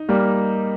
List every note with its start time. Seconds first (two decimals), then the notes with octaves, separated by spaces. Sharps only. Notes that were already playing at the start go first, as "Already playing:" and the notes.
Already playing: D#4
0.09 G3 A#3